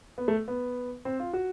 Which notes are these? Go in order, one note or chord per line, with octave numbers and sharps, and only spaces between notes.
B3
A3
B3
C4
F4
F#4